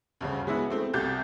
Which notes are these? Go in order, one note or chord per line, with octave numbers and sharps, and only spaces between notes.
D2 G2 C#3
G#3 B3 E4 F#4
A3 C4
C2 G4 G6 A6